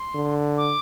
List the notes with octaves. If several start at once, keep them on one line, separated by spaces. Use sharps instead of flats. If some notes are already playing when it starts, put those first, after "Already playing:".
Already playing: C6
D3
D6